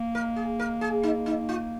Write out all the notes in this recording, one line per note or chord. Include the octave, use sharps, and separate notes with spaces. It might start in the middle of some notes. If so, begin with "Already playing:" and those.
Already playing: A#3
A#4
G#4
A#4
G#4
D#4
D#4
F4